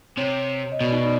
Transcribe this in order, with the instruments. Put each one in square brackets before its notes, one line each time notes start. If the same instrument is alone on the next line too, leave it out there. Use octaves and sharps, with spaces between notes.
[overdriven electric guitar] C3 [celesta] C#5
[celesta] D#5
[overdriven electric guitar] B2 [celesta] D5
[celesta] D#4 D#5
D5